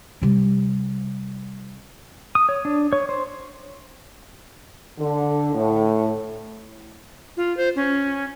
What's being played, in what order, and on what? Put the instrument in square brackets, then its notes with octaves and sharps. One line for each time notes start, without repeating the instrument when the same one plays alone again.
[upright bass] C3 G3
[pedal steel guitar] D#6
C#5
D4
C#5
C5
[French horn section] D3
A2
[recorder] F4
C5
C#4